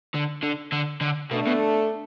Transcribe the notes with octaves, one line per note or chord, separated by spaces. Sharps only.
D3
D3
D3
D3
B2 A3 D4 A4
B2